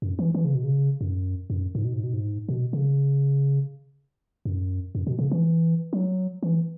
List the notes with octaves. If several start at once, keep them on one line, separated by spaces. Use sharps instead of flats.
F#2
E3
E3
C#3
B2
C#3
F#2
F#2
G#2
B2
G#2
B2
G#2
B2
C#3
F#2
F#2
B2
C#3
E3
F#3
E3